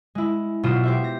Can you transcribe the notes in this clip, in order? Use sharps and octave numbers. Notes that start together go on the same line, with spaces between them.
G#3 E4
B2 F#3 F4 D#6 E7
G4 C5 E5
A#6